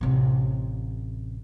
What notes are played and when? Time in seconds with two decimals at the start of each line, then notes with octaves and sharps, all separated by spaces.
0.01 A1 C3